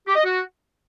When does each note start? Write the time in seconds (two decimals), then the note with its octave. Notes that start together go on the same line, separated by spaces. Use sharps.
0.07 G4
0.16 D#5
0.24 F#4